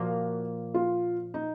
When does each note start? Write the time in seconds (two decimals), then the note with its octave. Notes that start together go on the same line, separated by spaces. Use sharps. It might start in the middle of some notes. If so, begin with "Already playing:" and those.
Already playing: A#2 F3 A#3 F#4
0.74 F4
1.34 D#4